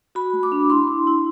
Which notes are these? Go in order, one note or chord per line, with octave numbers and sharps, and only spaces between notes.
F#4 B5
A3
D6
D4
E4 C6
E4
E4